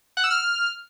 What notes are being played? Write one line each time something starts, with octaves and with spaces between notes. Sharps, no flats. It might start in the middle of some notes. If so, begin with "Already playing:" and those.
F#5
E6
F6